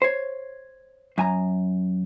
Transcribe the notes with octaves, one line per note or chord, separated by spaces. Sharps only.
C5 C#5
F#2 G#5 A#5